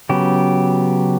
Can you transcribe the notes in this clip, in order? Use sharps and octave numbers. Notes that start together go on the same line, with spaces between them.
C#3 F#3 B3 G4